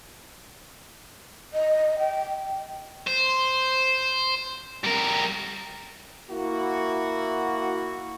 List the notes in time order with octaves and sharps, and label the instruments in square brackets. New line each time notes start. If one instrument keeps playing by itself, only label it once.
[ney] D#5
G5
[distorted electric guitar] C5
G3 A#4
[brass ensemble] A#3 E4 F#4